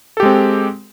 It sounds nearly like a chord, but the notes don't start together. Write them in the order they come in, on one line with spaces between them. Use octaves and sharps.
A4 G4 G#3 C4